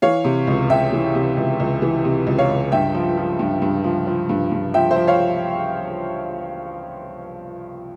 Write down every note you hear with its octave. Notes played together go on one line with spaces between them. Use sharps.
E3 C#5 F5
C3
C#2
C#2 E5 G5
E3
C3
C#2
C#2
E3
C3
C#2
C#5 F5
C#2
G2 E5 G5
F3
F3
G2
G2
F3
F3
G2
G2
F3 E5 G5
C5 E5
F3
C#5 F5